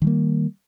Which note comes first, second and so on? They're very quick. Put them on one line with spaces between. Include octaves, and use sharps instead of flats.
D#3 G3 A#3